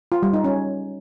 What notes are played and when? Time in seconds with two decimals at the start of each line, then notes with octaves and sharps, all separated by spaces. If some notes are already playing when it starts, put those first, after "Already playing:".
0.12 F4
0.23 G3
0.33 D#4
0.44 C#4